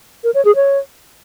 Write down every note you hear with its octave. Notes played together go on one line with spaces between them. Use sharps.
A#4
C#5
G#4
C#5